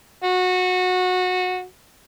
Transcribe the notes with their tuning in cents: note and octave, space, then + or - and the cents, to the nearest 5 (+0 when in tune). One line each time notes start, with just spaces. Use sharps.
F#4 -20